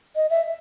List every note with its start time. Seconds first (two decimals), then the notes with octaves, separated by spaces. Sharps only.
0.16 D#5
0.30 E5